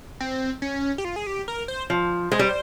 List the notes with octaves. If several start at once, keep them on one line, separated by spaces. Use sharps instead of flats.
C4
C#4
G4
F4
G#4
G4
A#4
C5
F3
G#3 C5
G3